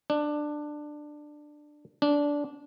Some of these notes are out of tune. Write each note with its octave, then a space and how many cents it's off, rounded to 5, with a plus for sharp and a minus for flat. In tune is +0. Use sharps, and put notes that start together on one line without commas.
D4 +15
D4 -15